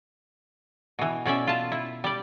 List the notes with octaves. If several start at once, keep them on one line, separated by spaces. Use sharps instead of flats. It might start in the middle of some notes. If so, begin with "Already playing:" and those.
B2 E3
B2 C#4 D5 E5
F4 A5
E4
G3 D5